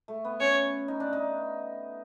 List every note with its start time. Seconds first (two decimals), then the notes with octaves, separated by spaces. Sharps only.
0.08 A3
0.25 B3
0.40 C#4 C#5
0.88 D#4
1.00 D4
1.13 D#4